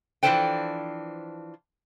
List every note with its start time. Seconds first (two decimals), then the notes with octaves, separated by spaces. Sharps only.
0.23 E3 F3 D4 A4 C5 G5